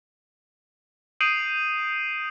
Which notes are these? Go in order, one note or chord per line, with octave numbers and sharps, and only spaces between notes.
D#6 G6 C7 D7 D#7 F#7